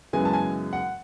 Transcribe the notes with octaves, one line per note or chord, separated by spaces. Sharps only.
F#2 C#3 E3 G#3 B3 G#5
A5
G#5
F#5